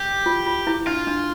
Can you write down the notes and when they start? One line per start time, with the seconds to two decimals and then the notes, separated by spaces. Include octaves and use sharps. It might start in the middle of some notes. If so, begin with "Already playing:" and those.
Already playing: G4
0.26 F4
0.46 F4
0.67 E4
0.87 D4 F4
1.07 D4